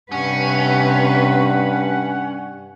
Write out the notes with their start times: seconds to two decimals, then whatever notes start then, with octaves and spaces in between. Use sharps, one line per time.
0.12 G2 C3 C#4 B4 F#5